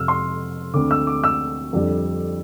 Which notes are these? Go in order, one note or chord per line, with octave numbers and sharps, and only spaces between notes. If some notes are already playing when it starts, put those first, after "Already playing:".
Already playing: F2 C3 F3 E6 F6
C6
D2 D3 A3 C4 D6
E6
D6
E6
F2 D3 G3 D4